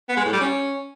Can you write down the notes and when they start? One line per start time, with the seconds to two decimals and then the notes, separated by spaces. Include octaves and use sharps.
0.09 B3
0.17 G#3
0.25 A2
0.33 G3
0.41 C#4